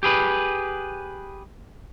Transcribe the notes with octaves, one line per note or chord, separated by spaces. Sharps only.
G4 G#4 B4